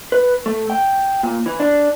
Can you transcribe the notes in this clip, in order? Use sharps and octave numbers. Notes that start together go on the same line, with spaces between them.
B4
A3
G5
A#2
E3
D4